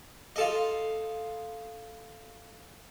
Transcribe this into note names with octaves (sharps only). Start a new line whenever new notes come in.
F4 A4 D#5